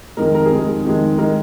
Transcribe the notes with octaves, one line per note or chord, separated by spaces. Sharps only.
F2 D#3 G#3 A#4
A#4
G#4
F2 D#3 G#3
G#4
F2 D#3 G#3
D#3 G#3 A#4